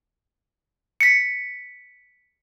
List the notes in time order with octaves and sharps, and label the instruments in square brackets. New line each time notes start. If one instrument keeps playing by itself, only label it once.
[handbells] B6 C#7